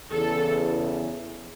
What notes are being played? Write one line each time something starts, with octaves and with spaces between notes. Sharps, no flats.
E2 C#3 E3 A4